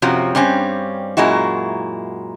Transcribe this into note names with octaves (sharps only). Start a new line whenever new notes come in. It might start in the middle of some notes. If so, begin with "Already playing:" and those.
F#2 C3 F3 F#3
G2 G3 C4 C#4
F#2 A#2 G#3 E4 F#4